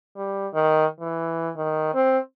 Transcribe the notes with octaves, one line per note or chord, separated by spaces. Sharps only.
G3
D#3
E3
D#3
C4